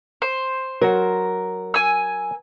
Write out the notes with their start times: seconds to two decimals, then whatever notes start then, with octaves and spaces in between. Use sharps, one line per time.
0.22 C5
0.81 F#3 F#4 A#4
1.74 G#5 E6